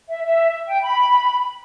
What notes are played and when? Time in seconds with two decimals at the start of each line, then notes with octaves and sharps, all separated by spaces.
0.09 E5
0.24 E5
0.68 G5
0.83 B5